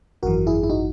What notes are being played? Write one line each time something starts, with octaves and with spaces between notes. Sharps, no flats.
G#1 F#2 E3 F#4 A#4
E4 G#4
E4
D#4 F#4